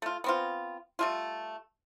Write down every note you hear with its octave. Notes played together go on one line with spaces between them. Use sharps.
A3 F4
B3 C4 F4
G3 A3 F4